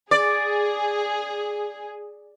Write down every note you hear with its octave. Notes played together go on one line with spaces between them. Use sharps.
G#4 D5